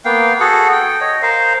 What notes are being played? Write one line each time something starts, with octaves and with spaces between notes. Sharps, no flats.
A#3 B3 F5 G5
F#4 G#4 A4 F#5
G5
C#5 D#5
A#4 C5 F5